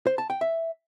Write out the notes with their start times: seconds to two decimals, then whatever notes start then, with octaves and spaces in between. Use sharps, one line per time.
0.07 C5
0.18 A5
0.30 G5
0.41 E5